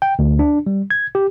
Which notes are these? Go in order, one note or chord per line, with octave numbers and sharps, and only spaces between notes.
G5
D2
D4
G3
G#6
G4